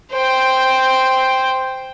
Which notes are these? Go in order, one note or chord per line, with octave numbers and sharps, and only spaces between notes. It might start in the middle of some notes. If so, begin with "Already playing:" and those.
C5 G5